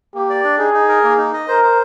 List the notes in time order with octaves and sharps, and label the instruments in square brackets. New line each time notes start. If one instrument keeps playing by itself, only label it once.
[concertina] A#3 [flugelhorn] G4
[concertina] D5
D4
[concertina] D#4 [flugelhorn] G#4
[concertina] D#4
A#4
A#3
D#4
D#5
[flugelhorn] A#4 [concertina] C5
[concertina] C5